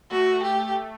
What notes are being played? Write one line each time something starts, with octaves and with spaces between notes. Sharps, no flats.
A3 F#4
G4